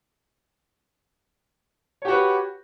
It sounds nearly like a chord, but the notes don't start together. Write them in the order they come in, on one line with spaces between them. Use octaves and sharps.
C#5 G4 F#4 B4